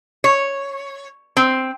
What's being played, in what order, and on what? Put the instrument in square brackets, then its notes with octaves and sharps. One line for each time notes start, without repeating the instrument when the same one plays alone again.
[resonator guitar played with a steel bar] C#5
C4